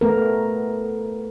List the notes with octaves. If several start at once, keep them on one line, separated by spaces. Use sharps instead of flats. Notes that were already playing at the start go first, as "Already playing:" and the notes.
A3 B3 A#4